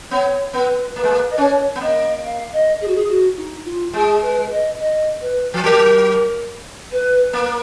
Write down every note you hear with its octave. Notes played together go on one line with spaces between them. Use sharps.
B3 C#5
B3 B4
A#3 B4
G#3
A#3
D#5
C#4 C#5
B3
A#3 D#5
F5
D#5
G#4
F#4
G#4
F#4
D#4
F4
G#3 G#4
B4
D#5
D#5
B4
F3
F#3 A#4
B4
A#3 B4